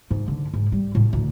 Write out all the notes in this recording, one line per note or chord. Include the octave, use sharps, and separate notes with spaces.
G#2
D3
G#2
G3
A2
D2